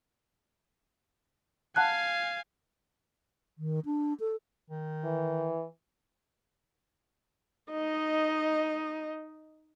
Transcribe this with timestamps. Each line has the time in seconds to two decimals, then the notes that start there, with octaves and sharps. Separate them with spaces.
1.76 F5 F#5 G#5 A5 F#6
3.58 D#3
3.85 D4
4.20 A4
4.70 D#3
5.05 E3
7.72 D#4 D#5